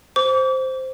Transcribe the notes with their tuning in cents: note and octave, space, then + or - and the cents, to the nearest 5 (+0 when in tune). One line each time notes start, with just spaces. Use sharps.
C5 +0 D6 -40